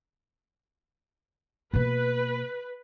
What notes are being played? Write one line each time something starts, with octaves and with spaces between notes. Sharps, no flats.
B2 A#3 B4